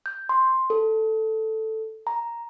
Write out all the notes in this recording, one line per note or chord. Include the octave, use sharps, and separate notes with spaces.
G6
C6
A4
A#5